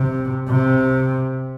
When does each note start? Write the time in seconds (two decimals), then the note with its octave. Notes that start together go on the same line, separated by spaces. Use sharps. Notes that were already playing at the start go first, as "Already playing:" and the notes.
Already playing: C3
0.49 C3